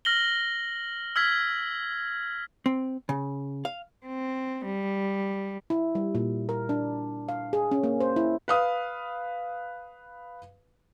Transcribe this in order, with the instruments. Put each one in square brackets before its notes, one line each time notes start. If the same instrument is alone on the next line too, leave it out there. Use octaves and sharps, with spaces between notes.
[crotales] F6 A#6 F#7 G7
E6 F6 G#6 B6
[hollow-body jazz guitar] C4
C#3
F5
[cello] C4
G3
[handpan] E4
G3
A#2
A#4
D4
F5
G#4
C#4
A#3
C5
E4
[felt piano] B4 F5 D#6